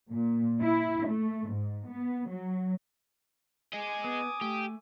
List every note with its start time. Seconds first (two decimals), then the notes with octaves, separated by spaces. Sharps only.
0.11 A#2
0.61 E4
1.08 A3
1.48 G#2
1.89 B3
2.29 F#3
3.73 G#4 D#5 G#5 D6
4.04 B3 D#6
4.41 A3 G4